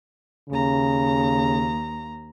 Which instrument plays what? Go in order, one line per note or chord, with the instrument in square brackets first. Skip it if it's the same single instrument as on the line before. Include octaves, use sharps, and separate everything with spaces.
[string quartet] D#2 A#5 [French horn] C#3